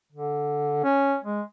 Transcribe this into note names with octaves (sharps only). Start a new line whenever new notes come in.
D3
C#4
G#3